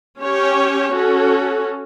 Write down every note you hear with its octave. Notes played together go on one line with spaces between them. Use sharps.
C#4 G4 C#5
C#4 F#4 A4